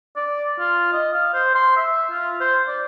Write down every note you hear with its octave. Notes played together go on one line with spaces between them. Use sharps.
D5
F4
D#5
F5
C5
C6
E5
F4
C5
D5